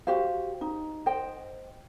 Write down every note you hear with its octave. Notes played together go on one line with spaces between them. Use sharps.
F#4 G4 C5 F5
D#4
C5 D#5 G5